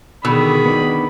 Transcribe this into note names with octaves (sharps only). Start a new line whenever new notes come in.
B2 D3 D#3 G#4 B5 E6
B3 D4 D#4